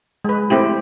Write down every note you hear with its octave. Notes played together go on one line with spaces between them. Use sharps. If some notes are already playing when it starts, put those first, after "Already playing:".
G#3 B4
A3 C4 E4 G4